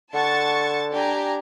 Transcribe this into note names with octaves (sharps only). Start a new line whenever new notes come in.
D3 F#5 A5 C#6 A6
D4 G4 G#5 A#5